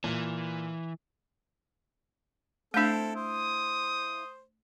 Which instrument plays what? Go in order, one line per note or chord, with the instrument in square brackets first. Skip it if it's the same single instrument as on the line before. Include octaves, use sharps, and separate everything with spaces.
[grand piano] A#2 [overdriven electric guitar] E3
[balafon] A3 D4 [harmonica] C4 A4 [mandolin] E4 F5 G6
[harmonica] C5 [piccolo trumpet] D#6